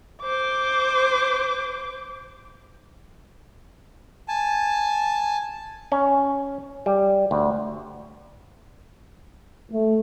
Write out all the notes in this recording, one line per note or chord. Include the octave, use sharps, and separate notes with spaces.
C5 D6
G#5 A5
C#4
G3
D2
A3